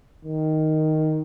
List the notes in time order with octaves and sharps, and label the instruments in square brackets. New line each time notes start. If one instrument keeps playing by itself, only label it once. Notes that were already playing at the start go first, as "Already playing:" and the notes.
[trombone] D#3